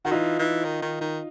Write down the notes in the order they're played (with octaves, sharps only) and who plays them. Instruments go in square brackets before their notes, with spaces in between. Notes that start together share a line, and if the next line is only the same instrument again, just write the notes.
[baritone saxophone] D#3 [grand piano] F#4
[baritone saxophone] E3 [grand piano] D#4 F4
[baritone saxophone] E3
D#3
D#3
D#3